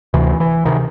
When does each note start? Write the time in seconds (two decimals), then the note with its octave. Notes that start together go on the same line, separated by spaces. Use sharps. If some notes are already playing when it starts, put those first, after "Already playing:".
0.14 D2 C3 E3
0.40 E3
0.65 C3 D#3